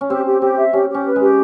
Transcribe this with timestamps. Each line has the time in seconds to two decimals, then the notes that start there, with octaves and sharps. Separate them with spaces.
0.01 C#4
0.10 C4 G4
0.25 G4
0.41 C4 G4
0.58 E5
0.73 C#4 G4
0.89 G4
0.95 C#4
1.05 B4
1.16 G#3 G4